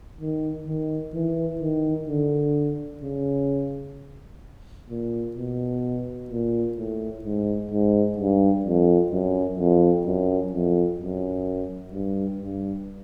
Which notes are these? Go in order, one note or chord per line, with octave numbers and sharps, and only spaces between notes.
D#3
D#3
E3
D#3
D3
C#3
A#2
B2
A#2
A2
G#2
G#2
G2
F2
F#2
F2
F#2
F2
F#2
G2
G2